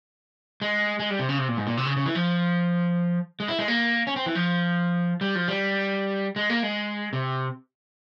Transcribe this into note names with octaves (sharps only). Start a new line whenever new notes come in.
G#3
G#3
G3
C3
C#3
C3
A#2
G#2
A#2
C3
C#3
C#3
E3
F3
G#3
E4
G#3
A#3
C#4
C4
E3
F3
G3
F3
G3
G#3
A#3
G#3
C3